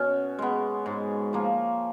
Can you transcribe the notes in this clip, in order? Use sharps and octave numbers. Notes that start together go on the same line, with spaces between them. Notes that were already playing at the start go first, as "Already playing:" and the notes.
Already playing: B2 C#4
G#3 B3
G#2
F3 A#3